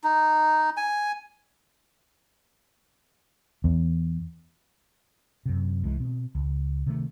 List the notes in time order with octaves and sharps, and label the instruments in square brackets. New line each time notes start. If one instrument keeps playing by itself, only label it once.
[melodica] D#4
G#5
[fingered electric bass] E2
[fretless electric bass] F#2 C3
C2 E3 G#3
B2 C4
C#2
C3 D#3 A3